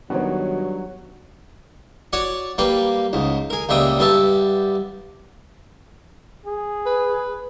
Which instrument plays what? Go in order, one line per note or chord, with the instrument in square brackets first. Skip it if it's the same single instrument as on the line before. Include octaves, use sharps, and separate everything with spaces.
[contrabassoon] G2 [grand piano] D#3 B3 [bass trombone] F#3 [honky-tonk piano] F#4 C#5
[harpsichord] F#4 C#5 D5 F#5
G3 A#3 G4 B4
C#2 G#2
G#4 A#4
C#2 A#2 G3 E5 G5 D#6
G2 B3 G4 E5 A5
[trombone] G#4
[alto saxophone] B4